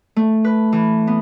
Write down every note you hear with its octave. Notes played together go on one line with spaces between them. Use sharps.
A3
B4
E3
B3